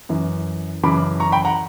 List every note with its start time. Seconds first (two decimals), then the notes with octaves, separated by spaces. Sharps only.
0.09 F#2 E3
0.83 F#2 C#3 E3 B5 D6
1.20 A#5 C#6
1.32 G5 B5
1.45 F#5 A#5